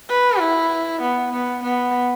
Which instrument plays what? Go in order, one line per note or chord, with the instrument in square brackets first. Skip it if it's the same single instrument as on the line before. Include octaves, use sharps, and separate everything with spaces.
[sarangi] B4
E4
B3
B3
B3